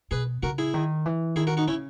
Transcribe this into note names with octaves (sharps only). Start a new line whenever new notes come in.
B2 G#4 B4
C#3 F#4 A#4
E4 G#4
D#3
E3
D#3 E4 G#4
F#4 A#4
D#4 F#4
C#3 C#4 E4